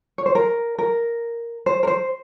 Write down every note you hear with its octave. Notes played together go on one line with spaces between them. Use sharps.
C#5
C5
A#4
A#4
C5
A#4
C5